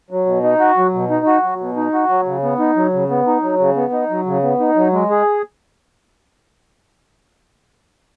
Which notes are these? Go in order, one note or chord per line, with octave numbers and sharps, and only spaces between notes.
F#3
B2
D#4
F#4
F#3
B2
D#4
F#4
F#3
B2
D#4
F#4
F#3
C#3
B3
D#4
F#3
C#3
B3
D#4
F#3
C#3
B3
D#4
F#3
C#3
B3
D#4
F#3
G#3
G#4